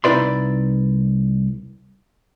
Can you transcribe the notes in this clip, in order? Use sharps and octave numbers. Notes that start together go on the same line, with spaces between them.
C2 D#4 E4 B4 D5 C6